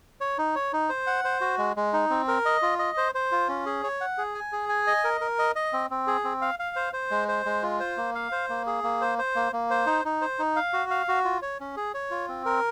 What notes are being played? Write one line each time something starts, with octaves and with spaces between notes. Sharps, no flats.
C#5
D#4
C#5
D#4
C5
F#5
C5
F#4
G#3
G#3
D#4
C4
A#4
D#5
F4
D#5
C5
C5
F4
C#4
G#4
C#5
F#5
G#4
G#5
G#4
G#5
D#5
A#4
A#4
D#5
D#5
C4
C4
G#4
C4
F5
F5
C5
C5
G#3
C5
G#3
F4
C5
A#3
F5
C5
A#3
G#4
A#3
C5
C5
A#3
A#3
C5
D#4
D#4
C5
D#4
F5
F#4
F5
F#4
F4
C#5
C#4
G#4
C#5
F4
C4
A#4